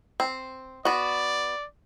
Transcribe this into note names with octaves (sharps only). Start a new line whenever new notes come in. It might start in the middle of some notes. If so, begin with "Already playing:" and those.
C4
B3 F#4 D5